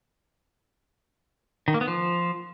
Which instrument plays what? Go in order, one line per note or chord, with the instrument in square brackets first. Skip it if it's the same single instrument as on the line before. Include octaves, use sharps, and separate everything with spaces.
[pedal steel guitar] D#3
A#3
B3
F3